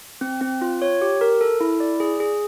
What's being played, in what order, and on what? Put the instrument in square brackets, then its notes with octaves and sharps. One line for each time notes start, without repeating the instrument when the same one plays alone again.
[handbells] C4
C4
F4
C#5
G4
A#4
A4
E4
D5
G#4
G#4